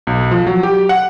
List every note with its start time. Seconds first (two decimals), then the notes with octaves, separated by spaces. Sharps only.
0.07 B1
0.31 F3
0.47 F#3
0.63 G4
0.89 F#5